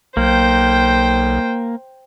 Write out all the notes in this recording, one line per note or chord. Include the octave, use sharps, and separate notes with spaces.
B1 A#3 C5 G5